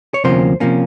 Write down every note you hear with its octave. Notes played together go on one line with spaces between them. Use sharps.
C#5
D2 C3 F3 A#3 C#4 C5
C3 F3 A#3 C#4